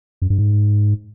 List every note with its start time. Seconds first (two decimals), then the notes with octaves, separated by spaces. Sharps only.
0.22 F#2
0.30 G2
0.38 G#2